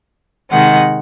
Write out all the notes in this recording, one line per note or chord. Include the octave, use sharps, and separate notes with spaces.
C3 D#3 G#3 F#5